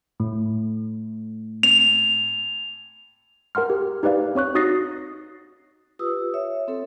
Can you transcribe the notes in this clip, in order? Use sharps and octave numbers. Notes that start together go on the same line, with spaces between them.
A2
F7
A#4 F#5 C6 F6
G4
D#4 G4 B4 D5 F5
C4 C#5 C#6 F#6
D#4 F#4 D#6 A6 A#6 C7
F4 G4 B4 D#6 E6
C#5 E5
C4 A4 C#5